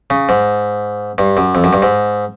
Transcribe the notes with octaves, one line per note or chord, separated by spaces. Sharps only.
C#3
G#2
G2
F#2
F2
F#2
G2
G#2